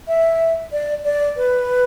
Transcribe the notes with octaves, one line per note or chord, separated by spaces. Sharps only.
E5
D5
D5
B4